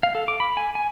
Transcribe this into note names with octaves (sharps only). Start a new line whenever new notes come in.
F5
A4
D6
B5
G#5
G#5